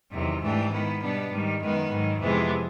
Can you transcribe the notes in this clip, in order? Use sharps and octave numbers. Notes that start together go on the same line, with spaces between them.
E2 C3 D#3 F#3
G#2 E3 A3 D4 G4
D#3 G#3 B3 E4
B2 G3 B3 D4
G#2 D#3 G3
F#2 D#3 G#3 B3
G#2 D#3 F#3
F2 C3 E3 G#3 B3